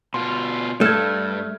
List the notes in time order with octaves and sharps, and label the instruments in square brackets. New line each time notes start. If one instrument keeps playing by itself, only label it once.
[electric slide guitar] B2 F4 [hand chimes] C6
[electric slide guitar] G2 [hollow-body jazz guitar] A3 [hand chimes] F6 G#6